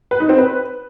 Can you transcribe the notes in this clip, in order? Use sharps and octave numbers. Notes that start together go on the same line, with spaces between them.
B4
D#4
C4
B4